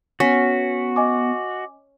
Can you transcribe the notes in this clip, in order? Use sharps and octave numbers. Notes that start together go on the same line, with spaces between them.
B3 C#4 F#4 B6
D#5 G#5 D6